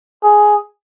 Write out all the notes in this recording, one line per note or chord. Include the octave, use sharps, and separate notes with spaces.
G#4